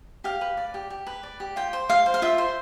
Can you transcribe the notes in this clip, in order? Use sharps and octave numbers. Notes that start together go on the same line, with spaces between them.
G4 F5
B4
D5
G4
G4
B4
D5
G4
F4 G5
C5
F4 F5
C5
F5
F4 E5
C5